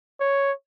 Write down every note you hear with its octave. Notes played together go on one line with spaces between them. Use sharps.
C#5